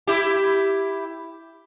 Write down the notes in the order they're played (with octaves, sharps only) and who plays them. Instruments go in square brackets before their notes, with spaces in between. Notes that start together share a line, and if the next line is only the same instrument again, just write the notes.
[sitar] E4 G4